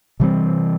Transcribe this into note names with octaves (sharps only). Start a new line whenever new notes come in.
C3 E3 G3 C4